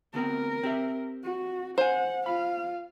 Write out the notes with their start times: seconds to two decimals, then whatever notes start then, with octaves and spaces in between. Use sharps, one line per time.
0.14 D2 B3 C4 A#4
0.63 C4 G4 E5
1.23 F#4
1.78 C5 F#5 G#5
2.26 F4 F5 B5